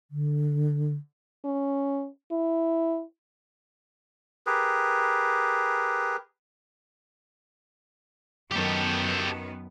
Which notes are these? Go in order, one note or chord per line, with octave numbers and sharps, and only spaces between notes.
D3
C#4
E4
G4 G#4 A#4 B4
F#2 D#3 B3 G4 A4